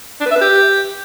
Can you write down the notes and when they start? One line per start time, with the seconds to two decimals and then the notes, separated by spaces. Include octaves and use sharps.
0.21 D4
0.26 B4
0.31 E5
0.36 B4
0.41 G4